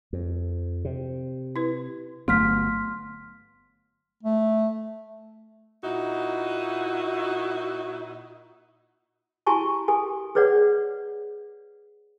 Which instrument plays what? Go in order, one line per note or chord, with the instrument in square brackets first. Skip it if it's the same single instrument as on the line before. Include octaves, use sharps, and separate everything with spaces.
[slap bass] F2
C3
[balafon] E4 B4
[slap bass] G1 F#3 B3 [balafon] A3 [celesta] C6 F6 B6
[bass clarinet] A3
[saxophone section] A#2 D#4 E4 F#4
[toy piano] E4 F#4 G4 G#5 A5 C#6
G4 A4 G#5
G#4 B4 C#5 D5 F#5